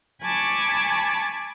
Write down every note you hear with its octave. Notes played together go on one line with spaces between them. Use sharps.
G#5 A5 B5 C#6 D6 G#6